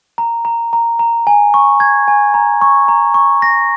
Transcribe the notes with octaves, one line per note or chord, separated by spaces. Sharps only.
A#5
A#5
A#5
A#5
G#5
C#6
G#6
G#5
A#5
C#6
A#5
C#6
A#6